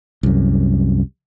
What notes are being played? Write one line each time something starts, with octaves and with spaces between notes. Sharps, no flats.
C2 F#2